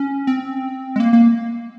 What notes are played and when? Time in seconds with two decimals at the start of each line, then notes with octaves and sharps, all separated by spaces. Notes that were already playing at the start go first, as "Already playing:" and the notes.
Already playing: C#4
0.27 C4
0.96 G#3
1.00 A#3
1.13 A#3